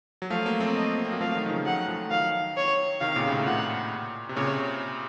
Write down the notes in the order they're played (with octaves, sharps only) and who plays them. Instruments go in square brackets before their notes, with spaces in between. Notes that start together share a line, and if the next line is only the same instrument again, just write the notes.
[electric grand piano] F#3
[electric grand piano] F3 A3 [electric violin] F5
[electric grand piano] F#3 A#3
A3 C4
[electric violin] D#5
[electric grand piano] A#3
C4
F#3 A#3
[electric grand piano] F3 A3 [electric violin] F5
[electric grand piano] D#3 F#3
D#3
C#3 F3
[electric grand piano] D#3 F#3 [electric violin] F#5
[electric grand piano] F3 A3
[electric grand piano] D#3 F#3 [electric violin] F5
[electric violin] C#5
[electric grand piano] C3 D#3 [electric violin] F5
[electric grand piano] A#2 C#3
C#3
A2 C3
[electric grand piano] A#2 [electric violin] F#5
[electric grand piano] C3
[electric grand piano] A#2 C#3 [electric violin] C#5